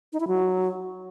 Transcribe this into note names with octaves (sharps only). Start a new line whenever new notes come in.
D#4
E4
F#3